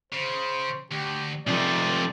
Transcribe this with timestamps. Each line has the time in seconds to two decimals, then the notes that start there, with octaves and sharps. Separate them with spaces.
0.12 C#3 C5
0.92 D2 G4
1.47 C3 F3 G#3 A3 D5